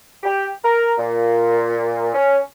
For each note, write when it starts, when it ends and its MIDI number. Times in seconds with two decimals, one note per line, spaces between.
0.23 0.49 67
0.65 0.92 70
0.98 2.13 46
2.14 2.38 61